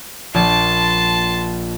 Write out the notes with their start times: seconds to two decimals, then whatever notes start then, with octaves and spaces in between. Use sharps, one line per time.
0.34 A#1 A5 C6 G#6